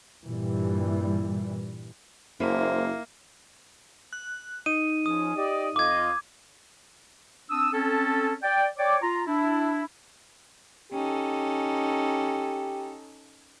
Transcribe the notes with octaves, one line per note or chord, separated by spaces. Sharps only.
G2 A#2 E3 G3
F#1 A#3 E4 C5
F#6
D#4 D#7
F3 C#4 G#4 D#6
G4 D5 D#5
F2 F4 D#5 D6 G#6
C4 D4 D#6 E6
C4 C#4 A4
D5 G5
C#5 D5 G5 D6
F4 A#5
D4 E4
C#4 D#4 G4 A4